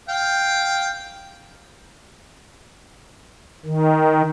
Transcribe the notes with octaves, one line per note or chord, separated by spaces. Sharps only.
F5 G5
D#3